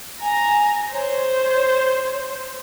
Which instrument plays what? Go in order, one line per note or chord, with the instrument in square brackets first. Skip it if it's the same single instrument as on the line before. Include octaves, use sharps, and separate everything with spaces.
[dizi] G#5 [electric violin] A#5
[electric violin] C5 [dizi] C#5